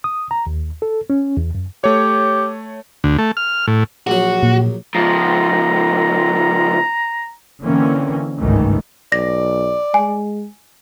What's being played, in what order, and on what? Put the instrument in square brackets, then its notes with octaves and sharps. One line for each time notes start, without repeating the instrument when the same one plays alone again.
[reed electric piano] D#6
A#5
D#2
A4
C#4
E2
F#2
[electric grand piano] A3 C#5 [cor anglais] G4
[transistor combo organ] D2
A3
F6
A2
[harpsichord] A#1 F#3 [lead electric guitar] F#4
[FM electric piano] A#2
[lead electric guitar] C#2 F3 [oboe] A#5
[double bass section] D3 E3 A#3 C4 C#4
G1 C#2 G#2 D#3 E3 A3
[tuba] B1 [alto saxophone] D5 [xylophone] A#6
[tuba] G#3 [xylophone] G#5